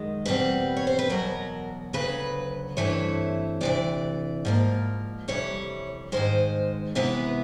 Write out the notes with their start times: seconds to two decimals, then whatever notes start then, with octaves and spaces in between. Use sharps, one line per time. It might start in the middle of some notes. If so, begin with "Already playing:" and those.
Already playing: F#2 D#3 G#3
0.25 E2 B2 G3 C4 B4
0.77 C#5
0.87 C5
0.99 B4
1.10 E2 B2 F#3 A#4
1.93 D2 C#3 F#3 B4
2.77 G2 E3 A3 C4 E4 C#5
3.61 D2 C3 E3 D5
4.45 G#2 F3 A#3
5.28 F2 C3 E3 G3 C#5
6.12 G#2 D#3 G#3 C5
6.95 C3 E3 G#3 B3 E4 B4